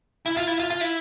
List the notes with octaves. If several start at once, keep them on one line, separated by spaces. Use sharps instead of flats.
E4
F4
E4
F4
F4
E4